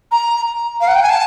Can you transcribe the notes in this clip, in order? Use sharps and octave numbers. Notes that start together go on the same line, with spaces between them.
A#5
F5
F#5
G5
G#5
A5